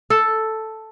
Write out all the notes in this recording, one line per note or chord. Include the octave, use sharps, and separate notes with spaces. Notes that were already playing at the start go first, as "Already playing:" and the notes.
A4